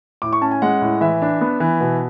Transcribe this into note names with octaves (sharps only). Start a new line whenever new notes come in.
A2 D6
C#6
C#4 A5
G#5
G#3 F#5
A2
E3 E5
D4
B3
E3
B2